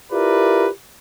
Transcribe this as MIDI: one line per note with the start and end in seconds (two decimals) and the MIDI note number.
0.12 0.68 64
0.12 0.68 65
0.12 0.68 67
0.12 0.68 70
0.12 0.68 71
0.12 0.68 74